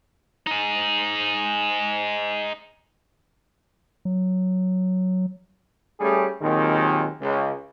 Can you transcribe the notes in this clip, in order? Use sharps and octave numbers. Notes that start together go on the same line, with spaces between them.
D#4 G#4
F#3
G3 A3 C#4 G#4
D#2 A#2 D#3 F#3 G#3 C4
C#2